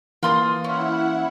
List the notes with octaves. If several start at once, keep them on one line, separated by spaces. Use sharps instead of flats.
E3 A#3 F4 C6 D#6 A6
C#4 E4 F#5